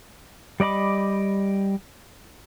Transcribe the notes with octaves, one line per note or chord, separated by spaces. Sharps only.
G3 D5 D#5 B5 D6